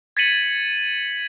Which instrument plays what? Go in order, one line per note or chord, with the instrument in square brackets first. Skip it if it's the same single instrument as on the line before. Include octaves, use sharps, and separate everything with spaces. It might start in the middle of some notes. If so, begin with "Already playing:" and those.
[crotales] G#6 A6 B6 C#7 D#7 F#7